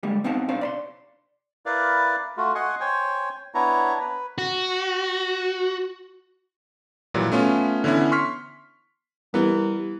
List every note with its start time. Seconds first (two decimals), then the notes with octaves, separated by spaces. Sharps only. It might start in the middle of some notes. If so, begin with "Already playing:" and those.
0.03 D3 G3 G#3 A#3
0.24 B3 C4 D#4 F5 F#5 A5
0.48 D4 C5 D5 F5
0.61 D5 B5 C6
1.66 E4 A#4 B4 D5 F5
2.37 A3 F4 F#4
2.55 D#5 F#5 G#5 C6 C#6
2.81 C5 C#5 G5 G#5
3.55 B3 D4 E4 C#5 A#5
4.00 B4
4.38 F#4
7.14 A#2 E3 F#3 G3
7.32 A3 B3 C#4 F4
7.84 D3 E3 B3 C#4 E4
8.12 C6 C#6 F6 B6
9.34 E3 G3 B3 A#4